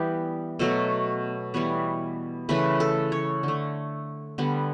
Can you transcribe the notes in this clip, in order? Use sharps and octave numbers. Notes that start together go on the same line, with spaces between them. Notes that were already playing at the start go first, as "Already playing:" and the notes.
Already playing: E3 G3 B3 G4
B2 F#3 A3 A4
E3 G3 B3 C#5
C#3 E3 A3 B4
A4
C#5
D3 A3
D3 G3 B3